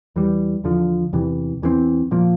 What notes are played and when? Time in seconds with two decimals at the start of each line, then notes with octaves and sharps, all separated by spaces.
0.16 E2 E3 G3
0.64 E2 D3 F3
1.13 E2 C3 E3
1.62 E2 E3 G3 C4
2.11 A#2 F3 A#3